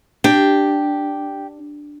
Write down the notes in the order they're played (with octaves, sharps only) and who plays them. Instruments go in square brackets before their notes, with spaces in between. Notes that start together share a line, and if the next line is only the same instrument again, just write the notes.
[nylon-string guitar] D4 [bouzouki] G4